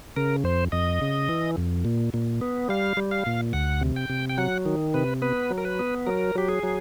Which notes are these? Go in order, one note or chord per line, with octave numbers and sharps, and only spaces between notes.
C#3 A#4
F2 C5
F2 D#5
C#3
E3
F2
A#2
A#2
B3
G3 F5
G3
F5
A#2
D2 F#5
C3
G5
C3
G5
F#3 F#5
D#3
C3 B4
B3 B4
F#3
A#4
B4
B3
F#3 A#4
F#3 G4
G#4
F#3